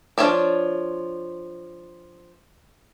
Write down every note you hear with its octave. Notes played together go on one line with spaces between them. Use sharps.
F3 F#3 D4 C#5 D5